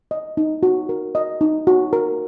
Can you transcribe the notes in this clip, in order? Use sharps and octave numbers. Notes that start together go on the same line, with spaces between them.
D#5
D#4
F#4
A#4
D#5
D#4
F#4
A#4